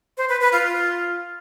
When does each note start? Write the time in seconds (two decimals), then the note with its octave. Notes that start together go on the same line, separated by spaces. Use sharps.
0.18 C5
0.29 B4
0.41 B4
0.53 F4